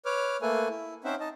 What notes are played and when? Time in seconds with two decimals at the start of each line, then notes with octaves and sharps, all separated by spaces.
0.06 B4 C#5 D6 F6
0.42 A3 A#3 A4 B4 G#5
0.69 E4
1.04 C4 C#4 D#4 C5 E5 F#5
1.20 D#4 D#5 A5